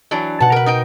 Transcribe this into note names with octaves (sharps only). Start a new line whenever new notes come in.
E3 F#3 D4
B2 F#5 A5
A#4 B4
D#4 A#4 G5